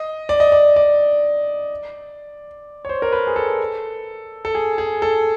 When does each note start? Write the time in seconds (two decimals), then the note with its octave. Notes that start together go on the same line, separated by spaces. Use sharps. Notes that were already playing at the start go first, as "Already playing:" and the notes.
Already playing: D#5
0.29 D5
0.40 D#5
0.52 D5
0.76 D5
2.85 C#5
2.89 C5
3.02 A#4
3.12 B4
3.27 G#4
3.36 A4
4.45 A4
4.55 G#4
4.78 G#4
5.02 A4